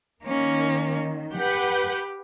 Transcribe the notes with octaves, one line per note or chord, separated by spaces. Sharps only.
D#3 A#3 C#4
G4 B4 F#5 G6